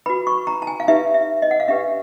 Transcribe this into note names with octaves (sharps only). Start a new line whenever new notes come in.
F#4 B4 B5
C#6
A#5
A5
G#5
F5
D#4 G4 B4 E5
E5
D#5
F#5
F5
D4 G4 B4 E5